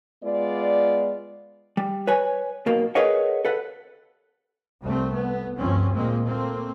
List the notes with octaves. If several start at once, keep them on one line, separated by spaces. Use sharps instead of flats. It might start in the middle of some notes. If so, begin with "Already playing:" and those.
G#3 B3 F4 D5
G3
B4 C#5 G#5
B1 B2 A#3
G#4 A#4 B4 C#5 D#5 F#5
A4 B4 F#5
C2 G3 A3 C4
B3
D2 G2 F3 G3 C4 C#4
A#2 G#3 A#3 C4
A3 A#3 C4